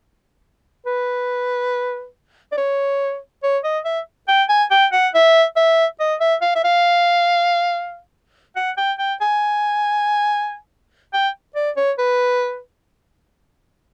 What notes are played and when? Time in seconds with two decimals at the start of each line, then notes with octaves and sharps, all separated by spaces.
0.86 B4
2.52 D5
2.57 C#5
3.43 C#5
3.64 D#5
3.85 E5
4.28 G5
4.49 G#5
4.71 G5
4.93 F#5
5.14 E5
5.56 E5
6.00 D#5
6.20 E5
6.42 F5
6.56 E5
6.64 F5
8.56 F#5
8.77 G5
8.99 G5
9.21 G#5
11.14 G5
11.55 D5
11.77 C#5
11.99 B4